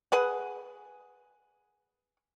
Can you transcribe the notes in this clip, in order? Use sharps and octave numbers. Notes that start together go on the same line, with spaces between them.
G#4 B4 F#5